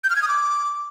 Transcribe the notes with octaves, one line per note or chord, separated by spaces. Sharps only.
G6
F6
G#6
D#6
D6